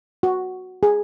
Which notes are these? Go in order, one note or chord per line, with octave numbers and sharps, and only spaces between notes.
F#4
G#4